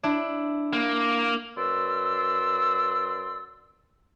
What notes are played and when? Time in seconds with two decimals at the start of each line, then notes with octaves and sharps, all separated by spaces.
0.03 D4 E4
0.73 A#3
1.57 F#2 B4 D5 C6 E6